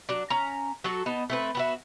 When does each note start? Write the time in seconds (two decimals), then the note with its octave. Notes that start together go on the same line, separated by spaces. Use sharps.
0.09 F#3 D4
0.30 C#4 A#5
0.84 F#3 F#4 A4
1.06 B3 D#4 A5
1.30 A3 C4 B4
1.55 B3 F#4 E5